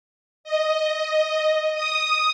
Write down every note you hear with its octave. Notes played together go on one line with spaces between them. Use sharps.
D#5
D#6